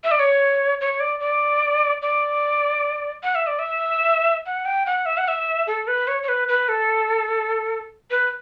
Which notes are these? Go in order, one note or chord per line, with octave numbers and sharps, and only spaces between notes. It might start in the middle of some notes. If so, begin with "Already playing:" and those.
E5
D5
C#5
C#5
D5
D5
D5
F#5
E5
D5
E5
F#5
G5
F#5
E5
F#5
E5
A4
B4
C#5
C#5
B4
B4
A4
B4